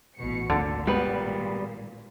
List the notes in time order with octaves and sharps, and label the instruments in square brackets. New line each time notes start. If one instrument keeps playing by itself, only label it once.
[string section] A1 B2 C#7
[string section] G#1 A#2 [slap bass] D2 [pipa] D3
[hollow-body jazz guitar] G3 B3 B4 [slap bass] G#3